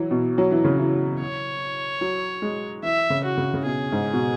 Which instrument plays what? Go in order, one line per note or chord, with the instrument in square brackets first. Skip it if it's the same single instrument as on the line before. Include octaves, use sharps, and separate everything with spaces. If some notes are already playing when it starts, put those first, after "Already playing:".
Already playing: [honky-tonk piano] E3 F#3
B2
F#3
E3
C#3
E3
[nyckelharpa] C#5
[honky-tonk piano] F#3
G#3
[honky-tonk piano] E3 [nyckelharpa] E5
[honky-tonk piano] C#3
[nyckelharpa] F#4
[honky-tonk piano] C#3
C#3
[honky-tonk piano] B2 [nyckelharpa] G#4
[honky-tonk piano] G#2
B2